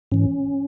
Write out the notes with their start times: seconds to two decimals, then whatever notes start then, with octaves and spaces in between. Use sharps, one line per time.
0.12 G#2 E3 C#4